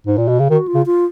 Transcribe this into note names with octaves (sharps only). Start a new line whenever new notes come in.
G#2
A#2
B2
C#3
D#3 F#4
F4
C#3
F4